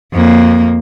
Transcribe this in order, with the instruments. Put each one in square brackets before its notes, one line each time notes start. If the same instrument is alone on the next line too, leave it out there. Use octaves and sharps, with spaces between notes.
[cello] F2 A#3